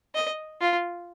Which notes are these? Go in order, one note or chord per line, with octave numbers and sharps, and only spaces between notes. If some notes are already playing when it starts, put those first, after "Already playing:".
D#5
F4